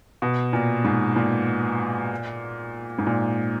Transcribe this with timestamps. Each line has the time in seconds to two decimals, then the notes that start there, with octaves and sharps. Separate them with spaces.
0.22 B2
0.53 A#2
0.84 G#2
1.16 A#2
2.99 G#2
3.07 A#2